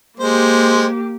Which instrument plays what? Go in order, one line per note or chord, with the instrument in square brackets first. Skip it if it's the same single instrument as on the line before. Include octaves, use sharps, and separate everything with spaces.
[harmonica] G#3 C5 [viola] A#3 G4